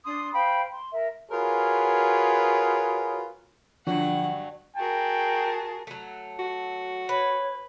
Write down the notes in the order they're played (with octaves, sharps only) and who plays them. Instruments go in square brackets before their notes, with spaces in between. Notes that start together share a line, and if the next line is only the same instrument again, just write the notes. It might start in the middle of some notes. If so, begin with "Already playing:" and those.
[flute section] D4 C6 D#6
C5 F5 G5 B5
C6
A#4 E5
[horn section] F4 F#4 G#4 A#4 B4 C#5
[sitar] G2 F#3 F#4 [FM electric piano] D3 F3 D4 [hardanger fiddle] F#5
[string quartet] F#4 G#4 A#4 [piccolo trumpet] G5 [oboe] A5
[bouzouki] F#3 A3
[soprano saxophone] F#4
[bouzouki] B4 [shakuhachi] C#5